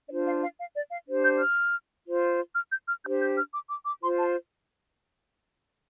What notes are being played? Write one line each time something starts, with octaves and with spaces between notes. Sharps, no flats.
D4 F4 C5 D5
F5
F5
F5
D5
F5
D4 G4 C5
G6
F6
F4 C5
F6
G6
F6
D4 G4 C5 G6
G6
F6
D6
D6
D6
F4 C5 C6
A5